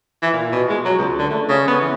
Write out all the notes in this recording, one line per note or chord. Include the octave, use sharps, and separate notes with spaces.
E3
A#2
B2
G#3
F#3
C#2
D3
A3
C#3
B3
E3